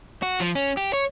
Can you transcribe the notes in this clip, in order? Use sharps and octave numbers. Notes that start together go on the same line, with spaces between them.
F#4
F3
C#4
G4
C#5